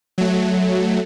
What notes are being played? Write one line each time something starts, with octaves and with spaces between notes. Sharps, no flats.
F#3 A3